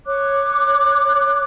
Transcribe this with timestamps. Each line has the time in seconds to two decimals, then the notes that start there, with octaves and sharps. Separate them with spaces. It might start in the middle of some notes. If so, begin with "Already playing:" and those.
0.06 C#5 D6 F#6